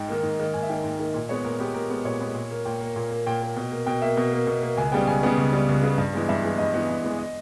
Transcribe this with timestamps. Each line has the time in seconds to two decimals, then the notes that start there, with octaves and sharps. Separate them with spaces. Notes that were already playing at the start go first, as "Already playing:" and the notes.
Already playing: G#2 G5
0.09 D#3 A#3
0.23 G#2
0.40 D#3 A#3
0.54 G#2 G#5
0.63 E5
0.69 D#3 A#3 G5
0.84 G#2 G5
0.99 D#3 A#3
1.14 A#2
1.29 G#3 B3 C#5
1.45 A#2 A#4
1.60 G#3 B3 G4
1.74 A#2 A#4
1.90 G#3 B3
2.05 A#2 C#5
2.21 G#3 B3
2.35 A#2
2.51 A#3
2.65 A#2 G5
2.81 A#3
2.96 A#2
3.11 A#3
3.26 A#2 G5
3.41 A#3
3.57 B2
3.72 A#3
3.86 B2 G5
4.02 A#3 E5
4.17 B2
4.32 A#3
4.47 B2
4.62 A#3
4.77 C#2 G#5
4.92 C#3 G3 B3 G5
5.07 C#2 G#5
5.23 C#3 G3 B3
5.38 C#2
5.52 C#3 G3 B3
5.69 C#2
5.83 C#3 G3 B3
5.98 G2
6.13 E3 G#3 B3
6.29 G2 E5
6.43 E3 G#3 B3
6.58 G2 D#5
6.74 E3 G#3 B3
6.89 G2
7.04 E3 G#3 B3
7.19 D#5